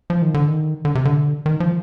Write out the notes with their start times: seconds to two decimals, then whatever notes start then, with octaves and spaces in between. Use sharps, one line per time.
0.10 F3
0.22 D#3
0.34 D3
0.48 D#3
0.85 D3
0.95 C3
1.05 D3
1.46 D#3
1.60 F3